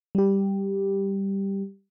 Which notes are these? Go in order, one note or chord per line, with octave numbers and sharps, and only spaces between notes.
G3 G4